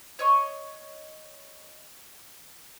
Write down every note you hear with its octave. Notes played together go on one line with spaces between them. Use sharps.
C#5 D#5 C#6